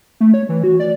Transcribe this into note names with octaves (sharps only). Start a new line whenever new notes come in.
A3
C#5
E3
F#4
D5